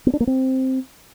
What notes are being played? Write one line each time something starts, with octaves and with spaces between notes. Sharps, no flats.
B3
D4
A#3
C4